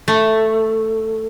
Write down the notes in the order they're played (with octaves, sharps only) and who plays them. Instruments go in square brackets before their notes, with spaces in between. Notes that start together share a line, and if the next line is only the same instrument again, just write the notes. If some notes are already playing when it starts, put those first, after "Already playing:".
[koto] A3